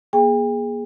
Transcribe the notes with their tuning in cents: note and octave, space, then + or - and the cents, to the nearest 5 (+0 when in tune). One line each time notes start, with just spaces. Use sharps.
A#3 +35 G#4 +0 G5 +40